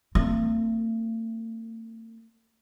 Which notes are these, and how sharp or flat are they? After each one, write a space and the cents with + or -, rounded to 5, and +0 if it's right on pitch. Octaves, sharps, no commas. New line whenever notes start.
A3 +45 C4 +0